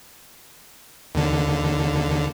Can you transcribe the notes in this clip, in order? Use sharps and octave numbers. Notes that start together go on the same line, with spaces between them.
D#2 D3